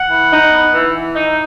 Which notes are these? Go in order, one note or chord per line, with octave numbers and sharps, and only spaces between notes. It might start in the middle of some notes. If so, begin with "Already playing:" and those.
Already playing: F#5
E3
D#4
B3
E3
E3
D#4